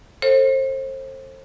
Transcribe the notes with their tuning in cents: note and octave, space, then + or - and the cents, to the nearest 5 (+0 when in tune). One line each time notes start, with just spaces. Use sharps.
A4 +25 C5 +30